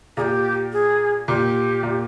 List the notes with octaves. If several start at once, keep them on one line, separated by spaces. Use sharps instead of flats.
A#2 G4 G#4
G#4
A#2 G4
A#2